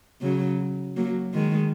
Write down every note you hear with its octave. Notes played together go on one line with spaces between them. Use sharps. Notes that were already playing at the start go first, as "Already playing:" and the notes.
C#3 F#3
F#3 A#3
D#3 G#3